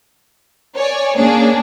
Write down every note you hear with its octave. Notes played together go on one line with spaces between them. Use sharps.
C#5 D5 G#5
A#3 C#4 D4 G#4